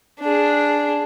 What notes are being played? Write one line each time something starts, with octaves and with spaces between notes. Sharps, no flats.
D4 G#4